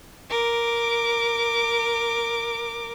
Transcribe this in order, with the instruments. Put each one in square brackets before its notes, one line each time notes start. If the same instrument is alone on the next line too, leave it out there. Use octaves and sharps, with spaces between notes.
[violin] A#4 D6